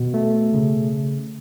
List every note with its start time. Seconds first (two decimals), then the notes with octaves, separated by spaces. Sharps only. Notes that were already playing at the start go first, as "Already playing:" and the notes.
Already playing: B2
0.14 A3
0.54 C#3